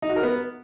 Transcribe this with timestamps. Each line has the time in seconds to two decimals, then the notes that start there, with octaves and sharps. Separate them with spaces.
0.02 D#4
0.09 F#4
0.16 A#4
0.23 B3